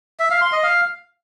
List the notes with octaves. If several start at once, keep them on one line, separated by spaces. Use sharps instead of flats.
E5
F5
C6
D#5
F5